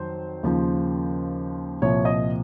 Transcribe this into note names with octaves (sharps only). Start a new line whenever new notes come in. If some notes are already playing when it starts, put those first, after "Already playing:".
Already playing: F2 D#3 F#3 C5
D#2 C#3 F3
C2 A#2 F3 C#5
D#5